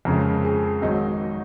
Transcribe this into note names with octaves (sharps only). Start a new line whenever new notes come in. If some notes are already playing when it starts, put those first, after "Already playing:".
F2 C#3 G#3 A#4
G#4
G#1 G#2 D#3 F#3 D#4